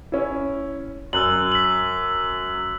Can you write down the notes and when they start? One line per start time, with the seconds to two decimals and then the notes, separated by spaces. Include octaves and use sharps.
0.12 C#4 E4
1.13 F#2 E6 F#6 F#7
1.52 B6 F#7